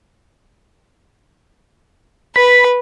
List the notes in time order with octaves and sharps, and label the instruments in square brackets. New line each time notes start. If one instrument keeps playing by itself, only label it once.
[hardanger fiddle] B4 [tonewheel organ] B5